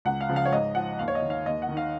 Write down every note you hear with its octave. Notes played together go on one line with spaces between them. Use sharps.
C#2 F#5
F5
C#3 F3
F5
C#5
G#2 D#5
F3 F#5
D#2 F5
C#5
D#5
D#3
F5
D#2 D#5
F#5
D#3
F5